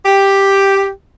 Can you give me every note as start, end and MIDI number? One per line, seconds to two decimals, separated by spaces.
0.06 0.87 67